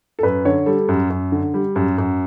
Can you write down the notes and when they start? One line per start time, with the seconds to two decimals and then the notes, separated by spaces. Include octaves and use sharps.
0.19 A4
0.23 F#2 B4
0.45 D3 C#5
0.66 G3 A4
0.88 F#2
1.10 F#2
1.32 D3
1.54 G3
1.76 F#2
1.98 F#2